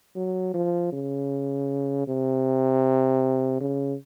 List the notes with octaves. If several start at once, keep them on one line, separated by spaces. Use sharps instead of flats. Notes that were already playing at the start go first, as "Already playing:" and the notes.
F#3
F3
C#3
C3
C#3